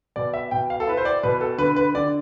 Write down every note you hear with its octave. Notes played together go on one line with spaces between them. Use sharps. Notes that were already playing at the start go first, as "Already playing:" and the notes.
B2 D5
E5
B2 G5
F5
A4
E4 B4
C5
D5
B2 B4
A4
D3 B4
B4
D3 D5